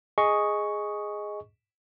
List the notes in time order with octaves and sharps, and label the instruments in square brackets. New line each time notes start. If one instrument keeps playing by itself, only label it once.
[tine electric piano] G#4 D#5 C#6